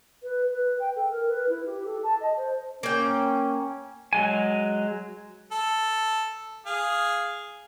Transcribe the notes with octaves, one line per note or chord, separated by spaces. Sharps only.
B4
B4
G5
A4
A#4
B4
E4
G4
A4
A5
D#5
C5
A#3 C#4 G5
F#3 G#3 G#5
A4
G#4 F5